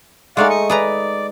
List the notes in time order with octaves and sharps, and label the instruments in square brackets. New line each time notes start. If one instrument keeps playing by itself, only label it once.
[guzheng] G#3 A3 D#4 [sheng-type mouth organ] D5 F5 F#5
[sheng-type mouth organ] C#6 D#6
[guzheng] G#4 B4 A#5 [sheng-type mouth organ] D5